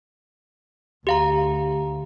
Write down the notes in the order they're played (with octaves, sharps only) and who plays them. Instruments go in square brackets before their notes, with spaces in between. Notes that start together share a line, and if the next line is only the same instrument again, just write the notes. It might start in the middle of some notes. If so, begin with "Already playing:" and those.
[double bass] D2 [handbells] G4 F5 A#5